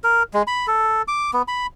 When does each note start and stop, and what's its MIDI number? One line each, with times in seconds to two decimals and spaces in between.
0.04 0.23 70
0.34 0.43 56
0.47 0.66 83
0.67 1.02 69
1.08 1.31 86
1.33 1.42 59
1.48 1.66 83